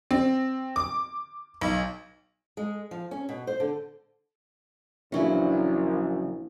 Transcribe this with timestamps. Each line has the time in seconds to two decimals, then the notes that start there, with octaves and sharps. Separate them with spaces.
0.11 C4
0.76 D6
1.61 B1
2.57 G#3
2.91 F3
3.11 C#4
3.29 B2
3.47 C5
3.60 D3
5.12 A#1 C#3 E3 F#3 C#4 E4